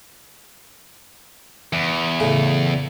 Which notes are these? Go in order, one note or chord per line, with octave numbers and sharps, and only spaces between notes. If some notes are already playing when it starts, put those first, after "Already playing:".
E2
A2 C#3